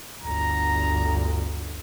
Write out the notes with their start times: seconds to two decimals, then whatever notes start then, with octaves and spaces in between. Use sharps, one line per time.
0.21 G1 D2 A#5